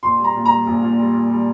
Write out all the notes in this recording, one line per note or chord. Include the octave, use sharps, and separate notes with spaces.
A#1 C6
G3
A#5
A#2
A#5
G3
A#1
A#2
G3
A#2
G3